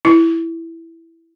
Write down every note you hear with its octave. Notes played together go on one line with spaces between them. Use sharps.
E4